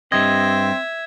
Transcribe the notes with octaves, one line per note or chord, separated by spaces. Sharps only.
G2 C4 D#5 E5 G#6